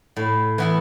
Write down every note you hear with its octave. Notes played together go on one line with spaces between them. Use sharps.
A2
E3 B3 E4